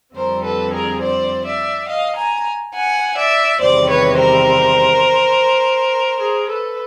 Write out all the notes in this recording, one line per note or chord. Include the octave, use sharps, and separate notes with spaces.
F2 D3 G3 C4 A#4 C5
A4 B4
G#4 A#4
C5 D5
D5 E5
D#5 F5
G#5 A#5
F#5 G#5
D5 E5
E2 C3 D#3 G3 C5 D5
B4 C#5
A#4 C5
G#4 A#4
A4 B4